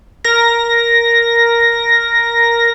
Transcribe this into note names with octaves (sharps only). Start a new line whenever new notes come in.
A#4 A#6